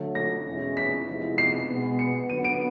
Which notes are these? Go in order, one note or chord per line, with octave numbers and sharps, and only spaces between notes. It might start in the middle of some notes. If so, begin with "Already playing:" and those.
Already playing: D3 F#3 A3
A#6
E2 B2 G#3 C#4 E4
B6
C3 F3 G#3 B3 E4
C7
B2 G#3 B3
C#7
D3 F#3 B3 D#7
D7